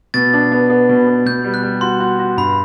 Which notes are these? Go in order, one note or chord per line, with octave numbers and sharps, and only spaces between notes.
B2 A6
D4
B3
B3
B2
B3
B2 G6
G3
F#6
G3
F#4 C6
F#4
F#4
G2 B5